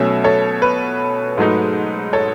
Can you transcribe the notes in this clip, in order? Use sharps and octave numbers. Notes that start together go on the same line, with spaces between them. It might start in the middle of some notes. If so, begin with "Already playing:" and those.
Already playing: B2 F#3 A3 C#4 E5 G#5
A4 C#5
B4
G#2 F#3 A3 D#4
A4 C#5